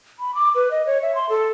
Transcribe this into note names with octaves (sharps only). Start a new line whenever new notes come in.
B5
D6
B4
D#5
C#5
E5
C6
A4